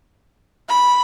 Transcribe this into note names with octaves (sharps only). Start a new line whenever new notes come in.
B5